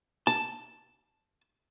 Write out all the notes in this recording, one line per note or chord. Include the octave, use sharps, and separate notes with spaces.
A5